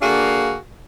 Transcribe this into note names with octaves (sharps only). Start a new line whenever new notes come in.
D3 A#3 D4 F#4 G#4 F5